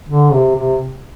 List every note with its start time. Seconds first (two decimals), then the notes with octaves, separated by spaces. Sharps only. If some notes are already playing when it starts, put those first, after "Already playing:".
0.09 D3
0.32 C3
0.56 C3